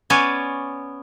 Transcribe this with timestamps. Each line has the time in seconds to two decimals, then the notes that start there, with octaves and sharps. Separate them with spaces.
0.10 B3 C#4 C#5 D5 G#5